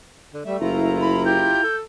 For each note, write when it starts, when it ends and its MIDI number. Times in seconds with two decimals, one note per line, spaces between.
0.34 0.43 50
0.46 0.57 55
0.46 1.15 57
0.46 0.57 76
0.61 1.56 30
0.61 1.63 64
0.61 1.63 65
0.61 1.63 82
1.01 1.23 83
1.25 1.59 67
1.25 1.76 91
1.64 1.82 69